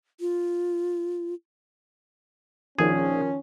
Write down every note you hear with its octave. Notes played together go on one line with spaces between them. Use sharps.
F4
A#1 D#3 F3 C#4 G#4